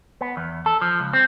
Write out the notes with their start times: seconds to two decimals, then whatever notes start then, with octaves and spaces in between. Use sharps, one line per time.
0.21 B3
0.37 E2
0.66 A4
0.81 F3
1.00 C#2
1.13 C4